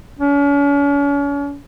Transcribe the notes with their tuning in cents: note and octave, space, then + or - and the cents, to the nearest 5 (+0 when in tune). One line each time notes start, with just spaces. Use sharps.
C#4 +40